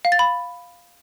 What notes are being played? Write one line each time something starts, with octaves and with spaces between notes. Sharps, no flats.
F5
A6
B5